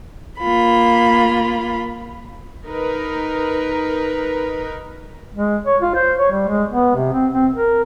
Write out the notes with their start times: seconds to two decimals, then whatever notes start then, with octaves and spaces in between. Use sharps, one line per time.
0.40 A#3 F4 B5
2.67 D#4 A#4 B4
5.34 G#3
5.66 C#5
5.82 F4
5.94 C5
6.19 C#5
6.31 G3
6.48 G#3
6.70 B3
6.95 C3
7.13 C4
7.33 C4
7.55 A#4